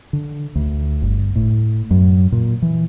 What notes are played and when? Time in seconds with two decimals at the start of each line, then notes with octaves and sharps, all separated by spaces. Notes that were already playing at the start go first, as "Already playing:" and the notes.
0.13 D3
0.56 D2
1.02 G1
1.36 A2
1.91 F#2
2.32 A#2
2.62 E3